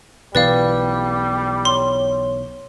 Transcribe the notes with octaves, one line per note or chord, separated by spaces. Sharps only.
B1 B2 E3 G3 B4 D5 F5
C#5 C6